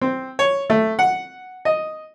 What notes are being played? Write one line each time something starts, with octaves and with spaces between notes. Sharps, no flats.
C4
C#5
A3
F#5
D#5